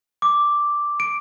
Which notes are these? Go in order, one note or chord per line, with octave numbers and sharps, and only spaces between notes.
D6
D7